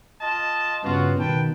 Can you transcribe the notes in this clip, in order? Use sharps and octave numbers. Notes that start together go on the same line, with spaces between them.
F4 D#5 A5
G2 C#3 B3 F4 F#4
B2 D#3 B4 G5 A5